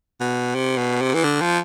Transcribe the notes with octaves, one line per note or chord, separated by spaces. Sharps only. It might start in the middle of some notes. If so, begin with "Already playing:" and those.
B2
C3
B2
C3
E3
D3
F3